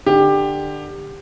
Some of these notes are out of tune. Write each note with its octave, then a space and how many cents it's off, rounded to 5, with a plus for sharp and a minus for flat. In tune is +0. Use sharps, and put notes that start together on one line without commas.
D3 +25 G4 +15